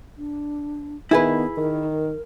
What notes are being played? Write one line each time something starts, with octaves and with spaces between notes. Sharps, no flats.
D4
D#3 B3 E4 G#4 B4
D#3 A#4